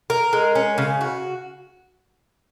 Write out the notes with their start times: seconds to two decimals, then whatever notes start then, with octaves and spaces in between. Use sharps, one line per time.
0.10 A#4
0.33 G#3
0.55 C#4
0.78 C#3
1.01 F#4